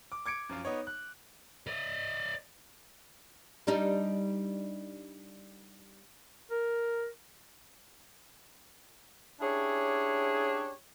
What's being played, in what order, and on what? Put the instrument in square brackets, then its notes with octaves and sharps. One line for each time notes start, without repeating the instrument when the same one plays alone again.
[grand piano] D6
D6 G#6 C#7 D7
F#2 F3 F4
B3 D#4 C#5
F#6
[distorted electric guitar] D5 D#5
[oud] G3 D4 D#4
[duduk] A#4
[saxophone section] C#4 D4 E4 G4 G#4 C#5